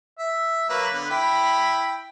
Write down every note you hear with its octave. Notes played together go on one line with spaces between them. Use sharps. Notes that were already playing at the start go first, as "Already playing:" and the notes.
E5
F#3 A#3 B4
D3 B3
E4 G5 B5